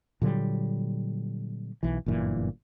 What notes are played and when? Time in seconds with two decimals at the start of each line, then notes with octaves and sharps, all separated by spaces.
0.22 A#2 D3 F#3 G3
1.83 B1 E3
2.06 G1 F#2 A#2 E3